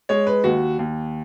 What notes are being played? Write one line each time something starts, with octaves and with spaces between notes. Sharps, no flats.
G#3 C#5
B4
D#2 F#4
D#2